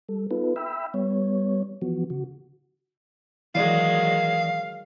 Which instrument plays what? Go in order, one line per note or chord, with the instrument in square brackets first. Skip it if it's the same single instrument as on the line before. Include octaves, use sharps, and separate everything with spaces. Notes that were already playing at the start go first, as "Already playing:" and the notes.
[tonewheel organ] G3 A4
B3 D#4 F4 A4 B4
E5 G5 B5 E6
G3 B3 C#5
E3 F3 B3 F#4
C#3 F#4
[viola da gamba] D#3 F#3 G#3 [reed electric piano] E3 D5 [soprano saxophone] F5